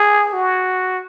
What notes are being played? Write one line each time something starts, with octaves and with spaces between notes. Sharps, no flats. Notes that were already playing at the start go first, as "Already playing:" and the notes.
Already playing: G#4
F#4